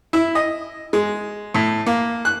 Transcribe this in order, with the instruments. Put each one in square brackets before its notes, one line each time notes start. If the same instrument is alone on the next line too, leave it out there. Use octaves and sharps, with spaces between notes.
[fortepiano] E4
D#5
G#3
A2
A#3
F#6